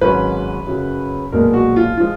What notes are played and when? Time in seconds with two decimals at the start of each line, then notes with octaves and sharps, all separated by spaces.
0.01 G#1 G#2 F#3 C#4 B4
0.67 F#2 C#3 F#3
1.32 B1 A#2 G#3 B3 A#4
1.54 F#4
1.76 F4
1.97 F3 G#3 F4